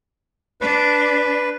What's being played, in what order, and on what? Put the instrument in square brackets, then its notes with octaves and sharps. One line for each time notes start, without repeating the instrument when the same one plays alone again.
[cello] D4 [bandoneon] B4